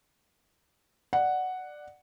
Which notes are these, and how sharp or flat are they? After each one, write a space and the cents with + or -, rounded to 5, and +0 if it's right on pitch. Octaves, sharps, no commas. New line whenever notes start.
D5 +15 F#5 +0